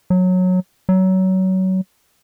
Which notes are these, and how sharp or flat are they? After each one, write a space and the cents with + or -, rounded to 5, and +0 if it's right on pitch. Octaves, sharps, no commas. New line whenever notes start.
F#3 -15
F#3 +25